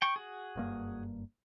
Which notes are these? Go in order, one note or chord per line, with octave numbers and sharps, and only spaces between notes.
G5 C#6
F#4 G#4
F#1 G2 A#3